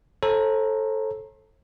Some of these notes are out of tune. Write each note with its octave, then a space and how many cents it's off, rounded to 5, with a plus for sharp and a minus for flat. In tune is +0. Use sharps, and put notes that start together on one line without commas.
A4 +0 C5 +45 A#5 +0